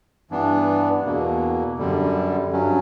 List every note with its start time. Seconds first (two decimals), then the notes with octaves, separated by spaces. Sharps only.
0.31 G2 E3 B3 D4
1.05 E2 B2 A#3
1.78 F#2 D3 G3
2.51 G2 F#3 C#4